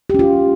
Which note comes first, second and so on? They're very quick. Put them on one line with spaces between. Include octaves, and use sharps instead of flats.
G4 C#4 F4